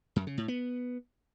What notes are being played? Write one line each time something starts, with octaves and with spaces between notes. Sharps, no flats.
F#2
C#3
A2
B3